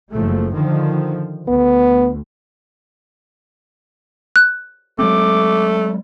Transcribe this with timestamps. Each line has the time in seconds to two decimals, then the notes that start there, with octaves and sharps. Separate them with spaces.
0.11 F#1 F3 A3
0.53 D3 D#3 F3
1.48 D2 B3
4.36 F#6
4.99 F#3 G#3 A3 C4 D6